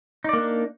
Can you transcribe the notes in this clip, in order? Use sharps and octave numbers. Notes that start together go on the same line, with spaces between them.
A#3 D4 D#4 D5